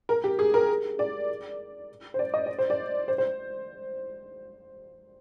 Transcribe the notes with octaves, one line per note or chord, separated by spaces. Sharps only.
A#4
G4
G#4
A#4
D5
C5
D5
D#5
D5
C5
D5
C5
C5